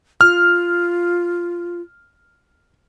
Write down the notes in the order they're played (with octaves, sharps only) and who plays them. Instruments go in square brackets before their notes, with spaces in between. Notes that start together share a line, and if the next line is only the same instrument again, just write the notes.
[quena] F4 [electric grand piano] F6